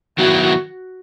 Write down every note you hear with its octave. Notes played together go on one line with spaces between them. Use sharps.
D#3 F#3 B3 E4 F#4